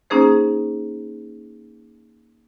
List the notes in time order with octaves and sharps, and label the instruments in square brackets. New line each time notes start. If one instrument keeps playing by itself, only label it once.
[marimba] A#3 C#4 D#4 G#4 C5